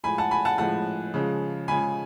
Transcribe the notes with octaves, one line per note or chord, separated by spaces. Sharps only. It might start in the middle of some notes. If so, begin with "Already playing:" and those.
A2 F3 G#3 G#5 B5
F#5 A5
G#5 B5
F#5 A5
A2 F3 G#3 F#5 A5
C#3 F3 G#3
C#3 F3 G#3 G#5 B5